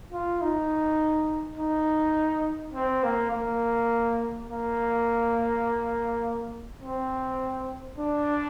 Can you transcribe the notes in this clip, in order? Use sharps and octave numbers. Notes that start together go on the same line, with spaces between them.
F4
D#4
D#4
C4
A#3
A#3
A#3
C4
D4